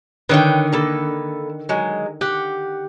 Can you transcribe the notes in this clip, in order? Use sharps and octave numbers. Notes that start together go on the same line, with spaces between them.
D3 D#3 B4 C#5 G5
A#3 A4 B4
F#3 G#3
G4 F#5